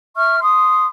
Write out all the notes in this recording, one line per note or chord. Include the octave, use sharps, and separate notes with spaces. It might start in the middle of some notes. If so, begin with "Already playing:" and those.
E5 C#6 F6
C6 D#6